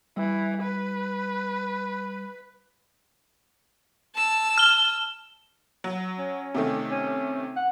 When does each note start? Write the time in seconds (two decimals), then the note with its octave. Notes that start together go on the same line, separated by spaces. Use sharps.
0.17 E3 G3
0.63 B4
4.15 A5 E6
4.58 F6 G7
5.84 F#3
6.18 C#4
6.54 C3 D#3 A3
6.91 C#4
7.56 F#5